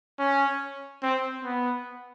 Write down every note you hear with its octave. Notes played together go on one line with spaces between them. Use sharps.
C#4
C4
B3